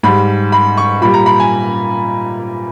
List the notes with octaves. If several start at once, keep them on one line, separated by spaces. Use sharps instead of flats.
G#2 G3 B5
B5
C#6
A#2 G3 B5
A#5
B5
G#5